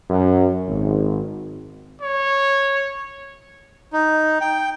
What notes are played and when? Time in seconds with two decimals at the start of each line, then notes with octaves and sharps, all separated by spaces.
0.10 F#2
0.68 G#1
2.02 C#5
3.93 D#4
4.41 G5